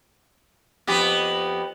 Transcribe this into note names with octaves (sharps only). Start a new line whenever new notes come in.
F2 B3 G4